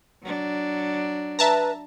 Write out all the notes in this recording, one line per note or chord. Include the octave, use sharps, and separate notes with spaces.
F#3 D4
B4 E5 A5 A#5